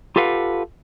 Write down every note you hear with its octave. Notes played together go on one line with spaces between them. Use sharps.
F4 G4 A4 B4 F5 F#5